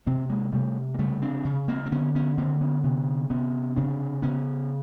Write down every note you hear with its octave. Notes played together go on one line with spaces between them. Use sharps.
C3 A#3 C4
G#3 A#3
C3 G3 A3
A#3
C#3 G3 A3
C4 D4
C#3
A#3 C4
C4
D3 B3 C#4
B3 C#4
D3 A#3 C4
B3 C#4
C3 B3 C#4
C3 B3 C#4
C#3 C4 D4
C#3 B3 C#4